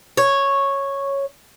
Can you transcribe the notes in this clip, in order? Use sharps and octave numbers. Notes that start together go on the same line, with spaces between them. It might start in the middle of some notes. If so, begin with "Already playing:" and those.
C#5